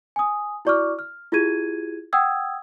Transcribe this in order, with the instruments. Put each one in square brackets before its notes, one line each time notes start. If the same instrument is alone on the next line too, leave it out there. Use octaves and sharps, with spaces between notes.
[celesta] G#5 D#6
E4 F#4 D5 C#6 D6 F6
F6
E4 F4 G4 G#4 G#6 D#7
F#5 G5 D#6 E6 G#6